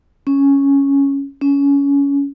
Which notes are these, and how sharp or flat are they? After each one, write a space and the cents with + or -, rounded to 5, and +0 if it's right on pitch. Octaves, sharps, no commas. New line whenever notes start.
C#4 +0
C#4 +20